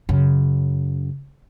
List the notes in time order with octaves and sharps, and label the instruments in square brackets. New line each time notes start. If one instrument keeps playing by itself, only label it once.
[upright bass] F#2 C#3